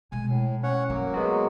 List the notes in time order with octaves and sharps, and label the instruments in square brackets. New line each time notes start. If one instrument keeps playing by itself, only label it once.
[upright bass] B2 G#3 [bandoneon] G#5
[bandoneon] A2
[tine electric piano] C#4 [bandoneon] C#5 F#5
[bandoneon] F#3 A#3 [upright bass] A3
[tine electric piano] G#3 B3 F#4